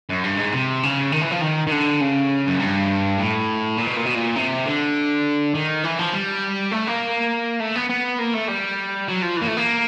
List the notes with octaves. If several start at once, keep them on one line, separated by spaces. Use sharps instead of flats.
F#2
G2
G#2
C3
C#3
D#3
E3
F3
D#3
D#3
D3
C#3
F#2
G2
A2
A#2
B2
A#2
B2
A#2
C3
D3
D#3
E3
F3
G3
A3
A#3
A3
B3
B3
A#3
A3
G3
F#3
F3
E3 A#3
A3
A#3